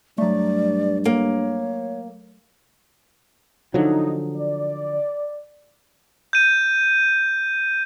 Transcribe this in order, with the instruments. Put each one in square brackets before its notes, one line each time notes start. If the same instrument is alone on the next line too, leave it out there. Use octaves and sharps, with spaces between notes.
[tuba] G2 [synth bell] F#3 A3 [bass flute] D5
[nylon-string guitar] A#3 [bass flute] C#5
[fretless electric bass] D3 F3 F#3 [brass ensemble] D#4
[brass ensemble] D5
[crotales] G6 D#7